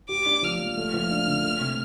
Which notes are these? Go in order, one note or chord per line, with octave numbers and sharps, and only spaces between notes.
G4 D6
D4
F3 F6
F3
A3
F3
D4
D3
A3
C3